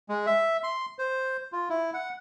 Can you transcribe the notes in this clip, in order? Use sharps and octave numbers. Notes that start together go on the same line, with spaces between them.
G#3
E5
C6
C5
F4
E4
F#5